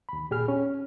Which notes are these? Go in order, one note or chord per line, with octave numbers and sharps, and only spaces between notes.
D#2 B5
A#2 G4 G#4 F6
C#4